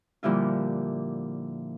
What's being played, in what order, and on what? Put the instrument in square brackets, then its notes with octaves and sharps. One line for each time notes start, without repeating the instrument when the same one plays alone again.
[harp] A#2 D3 F3 G3 E4 F4